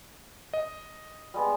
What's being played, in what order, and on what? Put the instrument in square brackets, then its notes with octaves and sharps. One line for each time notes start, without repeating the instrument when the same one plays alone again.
[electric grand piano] D#5
[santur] G3 G#3 B3